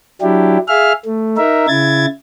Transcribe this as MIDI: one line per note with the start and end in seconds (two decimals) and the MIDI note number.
0.22 0.58 54
0.22 0.58 62
0.22 0.58 64
0.22 0.58 67
0.68 0.93 68
0.68 0.93 76
0.68 0.93 77
0.68 0.93 89
1.05 1.37 57
1.37 1.66 63
1.37 1.66 70
1.37 1.66 76
1.68 2.06 49
1.68 2.06 64
1.68 2.06 92
1.68 2.06 93